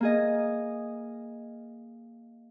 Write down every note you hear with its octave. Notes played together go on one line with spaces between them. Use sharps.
A#3 G#4 D#5